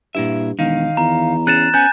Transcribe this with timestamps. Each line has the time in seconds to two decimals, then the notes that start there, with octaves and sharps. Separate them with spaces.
0.15 G2 A#2 E4 E5
0.59 E1 D#3 D#4 F5
0.97 E2 A#5
1.47 C#4 G#4 F#6 A6 E7
1.74 B3 C#4 G#5 G6